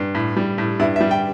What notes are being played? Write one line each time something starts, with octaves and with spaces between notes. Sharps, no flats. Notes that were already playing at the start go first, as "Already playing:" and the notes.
Already playing: G2
A2
G3
A2
G2 E4
E5
G3
G5